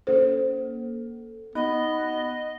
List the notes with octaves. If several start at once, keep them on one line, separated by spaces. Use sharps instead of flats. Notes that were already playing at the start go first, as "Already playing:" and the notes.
A#3 A4 C5
B3 D#4 D#5 B5 F#6